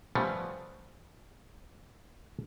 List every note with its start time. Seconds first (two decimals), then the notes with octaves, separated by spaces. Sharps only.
0.15 F3 G3 A3 B3 C#4